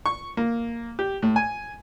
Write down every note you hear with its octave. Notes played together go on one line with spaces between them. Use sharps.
C#6
A#3
G4
A2
G#5